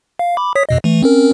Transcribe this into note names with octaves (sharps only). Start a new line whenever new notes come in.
F5
B5 D6
C#5 D#6 B6
F2 B2 D#5
E3 A3
C4 C#4 A#4